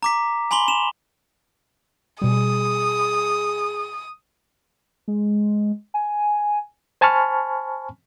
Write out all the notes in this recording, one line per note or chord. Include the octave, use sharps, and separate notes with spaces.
A#5 D6 B6
G#5 B5 C6 F#7 G7
E7 F7
B2 G3 G#4 D#6
G#3
G#5
C5 G#5 A5 B5 C#6 F6